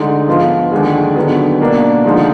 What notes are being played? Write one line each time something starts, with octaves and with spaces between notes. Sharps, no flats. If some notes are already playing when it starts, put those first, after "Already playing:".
Already playing: D2 D3 G#3 D#4
G#2 F3 B3 F4
D#2 D3 G#3
D#2 D3 F#3 B3
B2 A#3 D4
D#2 D3 F3 G#3 D#4